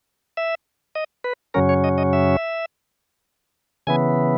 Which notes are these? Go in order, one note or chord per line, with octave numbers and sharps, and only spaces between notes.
E5
D#5
B4
F#2 C#3 F#3 C#4 A#4
C#5
D#5
D#5
E5
C#3 E3 B3 G#5